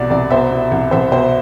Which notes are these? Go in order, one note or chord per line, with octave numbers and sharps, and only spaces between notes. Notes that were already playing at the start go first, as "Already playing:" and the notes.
Already playing: C2 B2 D5
C2 D5
B2 C5 E5
B2
C2
C2 C5 E5
B2 C5